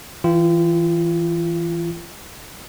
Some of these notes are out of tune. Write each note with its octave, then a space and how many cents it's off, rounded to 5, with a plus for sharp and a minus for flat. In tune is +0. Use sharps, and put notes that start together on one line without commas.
E3 +0 F4 -35 G5 +0